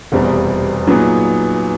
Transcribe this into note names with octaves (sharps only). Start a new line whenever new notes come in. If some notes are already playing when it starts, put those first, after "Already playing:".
F1 E2 B2 G3 C4
A#2 F#3 B3 D#4 G#4